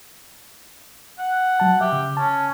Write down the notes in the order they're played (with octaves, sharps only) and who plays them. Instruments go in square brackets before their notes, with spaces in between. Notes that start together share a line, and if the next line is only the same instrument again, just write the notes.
[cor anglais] F#5
[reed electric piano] F#3 A5
[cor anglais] G4 [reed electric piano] E5
[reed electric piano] C#3
[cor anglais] C#4 [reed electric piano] A5